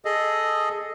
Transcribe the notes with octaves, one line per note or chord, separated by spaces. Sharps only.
G#4 A4 D#5